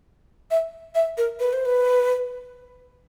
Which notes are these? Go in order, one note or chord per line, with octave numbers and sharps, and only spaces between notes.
E5
E5
A#4
B4
C5
B4